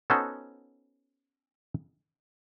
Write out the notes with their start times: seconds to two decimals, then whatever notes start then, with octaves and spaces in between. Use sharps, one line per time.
0.10 B3 C#4 D#4 F#4 A4 C5